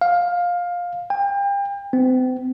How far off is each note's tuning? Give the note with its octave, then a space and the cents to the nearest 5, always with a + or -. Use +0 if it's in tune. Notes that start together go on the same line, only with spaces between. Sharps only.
F5 +15
G5 +35
C4 -40